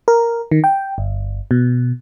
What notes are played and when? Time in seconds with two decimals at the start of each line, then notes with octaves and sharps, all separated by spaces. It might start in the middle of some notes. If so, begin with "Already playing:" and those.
0.08 A#4
0.51 D#3
0.64 G5
0.98 G1
1.51 B2